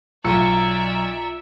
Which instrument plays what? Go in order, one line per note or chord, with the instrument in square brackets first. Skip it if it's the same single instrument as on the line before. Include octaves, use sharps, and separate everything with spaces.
[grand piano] B1 [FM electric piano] F4 E6 C#7 [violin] D5 E5 [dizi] A#5